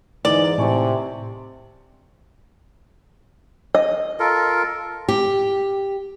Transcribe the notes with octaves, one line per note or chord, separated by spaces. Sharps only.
G#2 E3 D#4 D5
A2 C3 G#5 A5 C#6
D#5
F4 A4 A#4
G4